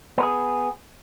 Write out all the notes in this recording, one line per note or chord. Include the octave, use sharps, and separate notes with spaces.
B3 G#4 A#4